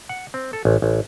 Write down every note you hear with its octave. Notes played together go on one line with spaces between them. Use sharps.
F#5
C4
A4
A1
A1